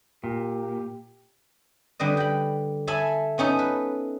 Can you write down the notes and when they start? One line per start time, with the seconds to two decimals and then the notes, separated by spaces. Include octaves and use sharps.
0.24 A#2 G4
1.99 D3 G3 B4 D#5
2.17 G5 B5
2.87 A4 E5 G#5 B5
3.38 B3 C#4 D#4 A4
3.59 B4